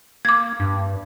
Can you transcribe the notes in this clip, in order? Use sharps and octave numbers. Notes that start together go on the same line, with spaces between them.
A#3 D6 G#6
G2